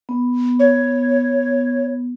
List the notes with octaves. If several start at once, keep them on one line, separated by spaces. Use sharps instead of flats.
B3
C#5